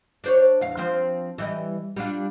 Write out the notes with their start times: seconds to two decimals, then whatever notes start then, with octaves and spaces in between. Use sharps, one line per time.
0.24 D4 C5 C#5
0.61 E2 F5
0.77 F3 C4
1.38 E3 G3 D#5
1.96 G3 D4 F4